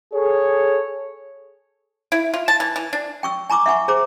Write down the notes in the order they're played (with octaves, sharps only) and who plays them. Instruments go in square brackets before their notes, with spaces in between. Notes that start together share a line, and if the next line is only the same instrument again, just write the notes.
[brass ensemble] G#4 A4 C#5
[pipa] E4
F4
A5
E3
E3
D4
[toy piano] G5 C#6 E6
G#5 A#5 C#6 D6 E6
E5 F#5 G#5 C#6
G#4 C5 A#5 D6